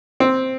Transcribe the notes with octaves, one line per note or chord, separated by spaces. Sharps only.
C4